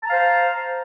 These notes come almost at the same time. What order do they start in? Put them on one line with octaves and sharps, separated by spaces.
A5 A#5 F5 C5